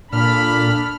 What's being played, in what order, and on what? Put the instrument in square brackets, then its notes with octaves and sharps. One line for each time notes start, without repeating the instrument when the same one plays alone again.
[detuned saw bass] A#2 [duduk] D4 [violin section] A4 B5 B6 [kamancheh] F6